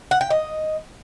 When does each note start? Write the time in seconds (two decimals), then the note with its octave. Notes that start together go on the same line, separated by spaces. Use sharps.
0.11 F#5
0.21 G5
0.30 D#5